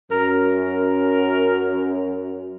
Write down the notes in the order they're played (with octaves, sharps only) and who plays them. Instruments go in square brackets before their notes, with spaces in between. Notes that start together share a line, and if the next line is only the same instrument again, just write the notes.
[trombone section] F#2 [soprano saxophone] A#4